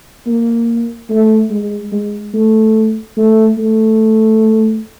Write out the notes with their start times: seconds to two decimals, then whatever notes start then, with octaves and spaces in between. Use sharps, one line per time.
0.27 A#3
1.10 A3
1.50 G#3
1.92 G#3
2.34 A3
3.17 A3
3.58 A3